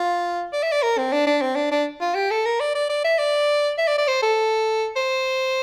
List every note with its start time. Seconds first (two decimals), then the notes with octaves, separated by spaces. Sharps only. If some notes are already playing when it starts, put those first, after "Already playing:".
Already playing: F4
0.53 D5
0.62 E5
0.72 D5
0.82 A#4
0.97 C4
1.12 D4
1.26 D4
1.41 C4
1.55 D4
1.71 D4
2.00 F4
2.15 G4
2.31 A4
2.45 A#4
2.60 D5
2.75 D5
2.89 D5
3.04 E5
3.19 D5
3.78 E5
3.87 D5
3.98 D5
4.08 C5
4.22 A4
4.96 C5